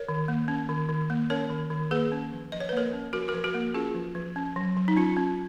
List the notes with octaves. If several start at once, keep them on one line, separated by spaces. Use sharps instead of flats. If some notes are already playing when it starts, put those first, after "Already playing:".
Already playing: A#4 C#5
D#3
A#3
C#4
D#3
D#3
A#3
C#4 A#4 C#5
D#3
D#3
A#3 G#4 B4
C#4
F3
F3 D#5
C#5
B4
A#3 A#4 C#5
C#4
F3 F#4 A#4
F#4 A#4
F3
F#4 A#4
A#3
C#4 F4 G#4
F3
F3
C#4
F#3
F#3
D#4
C#4 F4
C#4